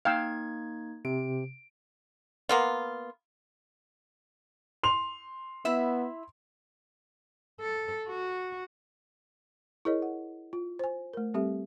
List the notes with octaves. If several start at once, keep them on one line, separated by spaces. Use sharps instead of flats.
A#3 D#4 F5 G5 E6 G#6
C3 D7
A#3 B3 F4
C6 F7
B3 E4 E5
A4
F#4
E4 G#4 A#4 C#5 D#5
F#5
F4
C5 G#5
A3 A#4
G3 C4 G4 A4 E5